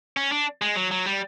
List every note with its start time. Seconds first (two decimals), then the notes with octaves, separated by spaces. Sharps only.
0.17 C#4
0.32 D4
0.62 G#3
0.76 F#3
0.91 F#3
1.06 G3